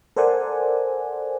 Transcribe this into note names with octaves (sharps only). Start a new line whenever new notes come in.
A4 A#4 C5 D5 F#5 G#5